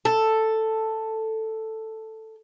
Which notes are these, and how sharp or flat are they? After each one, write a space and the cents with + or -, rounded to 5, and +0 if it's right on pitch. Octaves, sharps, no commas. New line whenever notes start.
A4 +5